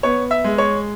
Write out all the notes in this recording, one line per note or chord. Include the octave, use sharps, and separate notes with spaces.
B3 C#5
E5
G#3
C#5